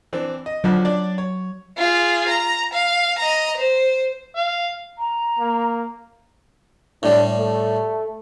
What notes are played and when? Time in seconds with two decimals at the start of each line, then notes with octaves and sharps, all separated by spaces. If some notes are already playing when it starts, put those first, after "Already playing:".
0.13 E3 C4 D4
0.46 D#5
0.64 F2 D3 F3 F#3
0.85 D4 D5
1.18 C#5
1.78 F4 G#4
2.28 A#5
2.73 F5
3.19 D#5 A#5
3.57 C5
4.36 F5
4.99 A#5
5.39 A#3
7.03 A2 G3 D4
7.39 A3